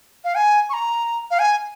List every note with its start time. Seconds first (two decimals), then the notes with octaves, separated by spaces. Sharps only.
0.24 F5
0.35 G#5
0.70 C#6
0.73 A#5
1.31 F5
1.39 G#5